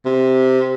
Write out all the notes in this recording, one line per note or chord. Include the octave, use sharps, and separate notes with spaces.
C3